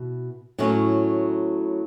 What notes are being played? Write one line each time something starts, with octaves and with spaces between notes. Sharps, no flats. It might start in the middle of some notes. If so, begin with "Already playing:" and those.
Already playing: B2 E4
A2 F#3 C#4 E4